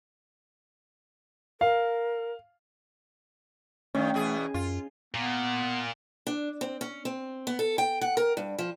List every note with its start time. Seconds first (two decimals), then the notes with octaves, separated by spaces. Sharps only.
1.61 A#4 F5
3.95 G2 D#3 A3 C#4
4.14 E2 B2 G#4
4.54 F#2 F4
5.14 A#2 B3
6.27 D4
6.61 C4
6.81 C#4
7.05 C4
7.47 B3
7.59 A4
7.78 G5
8.01 F#5
8.17 A#4
8.37 G2
8.59 F3